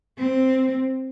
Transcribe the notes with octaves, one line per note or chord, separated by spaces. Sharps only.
C4